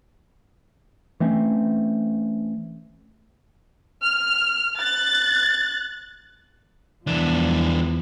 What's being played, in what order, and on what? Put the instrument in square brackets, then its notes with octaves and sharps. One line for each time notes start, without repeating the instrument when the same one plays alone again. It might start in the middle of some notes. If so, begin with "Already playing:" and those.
[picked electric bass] E3 A3 C4 C#4
[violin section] F6
F#6 A6
[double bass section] E2 F3 [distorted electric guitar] E3 D4